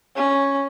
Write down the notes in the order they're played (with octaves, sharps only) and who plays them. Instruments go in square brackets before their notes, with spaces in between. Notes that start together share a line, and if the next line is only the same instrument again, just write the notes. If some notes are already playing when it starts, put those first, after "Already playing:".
[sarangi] C#4